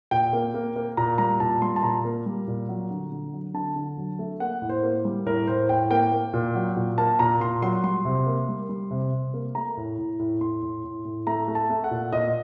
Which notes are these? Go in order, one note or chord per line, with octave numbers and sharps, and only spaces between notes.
A#2 G5
A#3
A#3
A#3
A#2 A#5
G3 A#5
A#2 A5
G3 C6
A5
A#2 A#5
A#3
G3
A#2
F#3
D3
D3
F#3
D3 A5
D3
F#3
A3
A#3 F#5
A2
C5
A#3
G3
A2 A#4
A2 C5
A2 G5
A#3 G5
A#3
A#2
F#3
A#2
A#3 A5
A#2 A#5
A#2 C6
F#3 C6
G3 C6
C3
A#3
G3
G3
C3
C3
A#3
A3 A#5
A2
A2
A2
A2 C6
A2
A2
A2
A3 A#5
A3
A5
A3
F#5
A#2
A#2 D#5